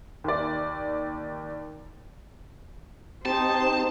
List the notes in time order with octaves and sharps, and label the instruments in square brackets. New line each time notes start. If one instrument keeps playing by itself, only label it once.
[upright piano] D#2 D5
[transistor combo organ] C4 G4 [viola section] D#4 C5 [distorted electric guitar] A5